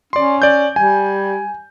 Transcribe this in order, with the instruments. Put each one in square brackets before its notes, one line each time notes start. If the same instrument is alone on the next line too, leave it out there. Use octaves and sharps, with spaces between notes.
[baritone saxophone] C#4 [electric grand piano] D5 C6
[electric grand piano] D5 G6
[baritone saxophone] G3 [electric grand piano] G#5